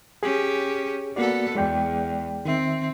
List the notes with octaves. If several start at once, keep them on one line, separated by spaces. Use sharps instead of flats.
C#4 G4 G#4
A#3 B3 F#4 A4 D5
E2 G#3 D5 G5
D#3 C4 E5